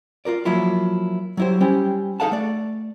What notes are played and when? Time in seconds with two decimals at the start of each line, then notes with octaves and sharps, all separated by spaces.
0.25 F4 G4 A#4 D5
0.45 F3 F#3 A#3 E4 F4
1.37 F#3 G3 E4 G4 C5
1.60 G3 C#4 E4 G4 C5
2.20 D#4 G#4 A4 F5 F#5 A5
2.32 A3 D5